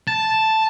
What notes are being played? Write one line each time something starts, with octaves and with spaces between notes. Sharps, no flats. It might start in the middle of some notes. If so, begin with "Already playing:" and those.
A5